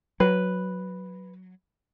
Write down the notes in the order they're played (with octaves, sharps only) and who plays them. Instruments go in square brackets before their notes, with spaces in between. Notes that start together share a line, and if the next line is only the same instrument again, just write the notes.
[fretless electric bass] F#3 [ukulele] B4